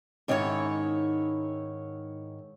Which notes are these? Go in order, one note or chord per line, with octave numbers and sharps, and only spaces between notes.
G#2 D#3 C#4 E4 G#4 C#5